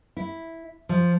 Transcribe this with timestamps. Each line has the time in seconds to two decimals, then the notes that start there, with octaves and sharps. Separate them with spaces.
0.17 E4
0.89 F3